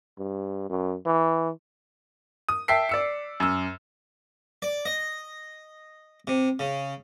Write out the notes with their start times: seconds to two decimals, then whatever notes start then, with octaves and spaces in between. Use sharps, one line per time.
0.18 G2
0.70 F#2
1.06 E3
2.49 D#6
2.68 E5 G5 A5 E6 B6 C7
2.89 D5 E6 C#7
3.40 F#2 E6
4.62 D5
4.86 D#5
6.27 C3
6.59 C#3